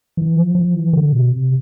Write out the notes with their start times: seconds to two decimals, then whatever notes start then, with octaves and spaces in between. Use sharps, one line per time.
0.17 E3
0.36 F3
0.55 F3
0.75 E3
0.93 D3
1.13 B2
1.31 C3